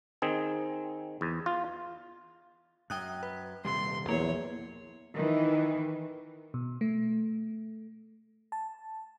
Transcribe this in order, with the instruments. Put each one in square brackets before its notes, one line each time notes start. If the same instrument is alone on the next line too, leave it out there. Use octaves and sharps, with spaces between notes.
[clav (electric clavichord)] D#3 C4 G#4
E2
F4
[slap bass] F#2 [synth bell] G5 D#6 F#6
[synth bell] B4
[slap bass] D#1 C3 G3 [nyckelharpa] C6
[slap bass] A#1 [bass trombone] E2 [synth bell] A#3 [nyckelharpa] C#5
[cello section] D#3 E3
[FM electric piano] B2
A3
A5